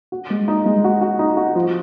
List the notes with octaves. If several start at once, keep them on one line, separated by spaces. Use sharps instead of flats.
F#4
G#3
D#4
G#3
F#4
F#4
D#4
F#4
F3